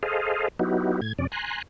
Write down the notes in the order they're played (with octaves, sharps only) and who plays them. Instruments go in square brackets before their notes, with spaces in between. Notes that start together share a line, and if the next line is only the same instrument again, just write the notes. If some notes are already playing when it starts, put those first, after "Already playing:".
[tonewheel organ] G#4 A4 C5 D#5 F5
F#3 B3 D#4 E4 F#4 G4
A2 G#6
F2 C3 C#4 D5
G#5 A#5 C6 F#6